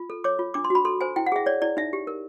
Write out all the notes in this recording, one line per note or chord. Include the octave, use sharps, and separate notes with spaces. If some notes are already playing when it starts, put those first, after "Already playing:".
Already playing: F4
A4
C#5 D6
F4
D4 D6
C6
F#4 B5
A4 C6
C5 G#5
E4 G5
F#5
G#4 E5
C#5 D5
E4 D5
D#4 E5
G4
A#4